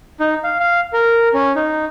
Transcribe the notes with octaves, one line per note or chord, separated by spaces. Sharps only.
D#4
F5
F5
A#4
C#4
D#4